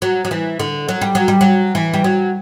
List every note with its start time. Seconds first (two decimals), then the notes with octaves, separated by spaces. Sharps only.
0.02 F#3
0.25 F#3
0.31 E3
0.59 D3
0.89 F#3
1.01 G3
1.15 F#3
1.28 G3
1.41 F#3
1.75 E3
1.94 G3
2.04 F#3